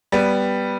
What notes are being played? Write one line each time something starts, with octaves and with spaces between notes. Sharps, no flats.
G3 B3